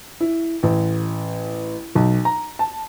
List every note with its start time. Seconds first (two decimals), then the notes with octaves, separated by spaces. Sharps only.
0.20 E4
0.63 A1
1.95 B1
2.25 A#5
2.59 A5